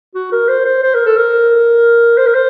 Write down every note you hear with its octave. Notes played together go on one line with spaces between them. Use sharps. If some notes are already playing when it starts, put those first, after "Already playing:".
F#4
A#4
C5
C5
C5
A#4
A4
A#4
C5
A#4
C5